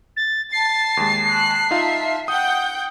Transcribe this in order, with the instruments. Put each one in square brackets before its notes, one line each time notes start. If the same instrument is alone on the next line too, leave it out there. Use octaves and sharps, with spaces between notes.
[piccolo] A6
[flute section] A5 [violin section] A6 [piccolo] C7
[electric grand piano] D#2 G#3
[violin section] F#6
[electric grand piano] D#4 F4 F5 [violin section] E5
[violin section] F#5 G5 G6 [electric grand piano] D#6